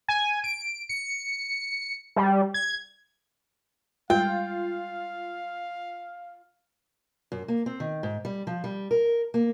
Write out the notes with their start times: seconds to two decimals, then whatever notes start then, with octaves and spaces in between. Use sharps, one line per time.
0.09 G#5
0.44 D7
0.89 C#7
2.16 G3
2.54 G#6
4.10 G3 G#3 F4 F5 G5
7.32 F#2
7.48 A#3
7.66 C4
7.80 D#3
8.03 G#2
8.25 G3
8.47 F3
8.64 G3
8.91 A#4
9.34 A#3